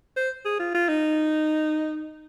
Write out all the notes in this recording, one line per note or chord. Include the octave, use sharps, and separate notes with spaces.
C5
G#4
F4
F4
D#4